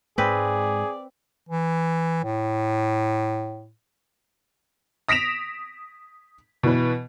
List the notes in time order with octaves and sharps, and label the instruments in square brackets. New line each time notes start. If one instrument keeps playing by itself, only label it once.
[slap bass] G#2 G#3 [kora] C4 B4 [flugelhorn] G#4 [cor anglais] D5
[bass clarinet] E3
A2
[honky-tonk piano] D#6 A#6 B6 D7 E7 F7
B2 E3 B4